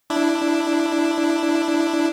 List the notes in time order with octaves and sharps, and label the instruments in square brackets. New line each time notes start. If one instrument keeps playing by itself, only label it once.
[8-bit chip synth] D4 E4